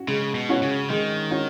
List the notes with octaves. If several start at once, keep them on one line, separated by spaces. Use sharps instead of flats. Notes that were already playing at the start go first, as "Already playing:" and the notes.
Already playing: C#4 F#4
C#3 G#3
B2
C#4 F#4 C#5
C#3
D#3 G#3
C#4 F#4 C#5